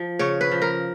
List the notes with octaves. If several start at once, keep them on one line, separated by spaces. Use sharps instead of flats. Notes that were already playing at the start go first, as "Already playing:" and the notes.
Already playing: F3
C#3 C#5
B4
F3
A#4